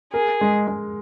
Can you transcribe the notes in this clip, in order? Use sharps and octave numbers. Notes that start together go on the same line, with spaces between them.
G#4 A#4
G#3
G#3